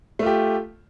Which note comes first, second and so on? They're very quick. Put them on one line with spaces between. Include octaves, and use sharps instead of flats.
A3 F4 G4